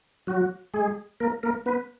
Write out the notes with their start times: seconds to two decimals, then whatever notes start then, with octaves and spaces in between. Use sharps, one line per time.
0.27 F#3 F#4
0.74 G#3 G#4
1.20 A#3 A#4
1.43 A#3 A#4
1.66 B3 B4